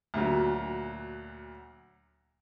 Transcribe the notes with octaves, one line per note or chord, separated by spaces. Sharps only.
D2 A#2 F#3